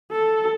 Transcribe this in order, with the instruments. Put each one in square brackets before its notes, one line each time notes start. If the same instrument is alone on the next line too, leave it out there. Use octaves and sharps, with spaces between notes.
[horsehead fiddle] A4